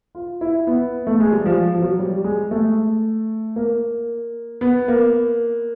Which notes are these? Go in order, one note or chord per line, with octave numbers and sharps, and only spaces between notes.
F4
E4
B3
A3
G#3
G3
F3
F3
F#3
G3
G#3
A3
A#3
B3
A#3